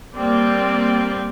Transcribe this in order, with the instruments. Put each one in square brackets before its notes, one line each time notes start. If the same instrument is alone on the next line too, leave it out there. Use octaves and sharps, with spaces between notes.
[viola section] G3 A#3 C4 D5